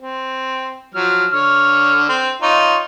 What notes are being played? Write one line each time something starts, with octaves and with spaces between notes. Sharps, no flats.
C4
F3 F#3 F6
D3 C#5 F6
C4
D#4 F4 C#5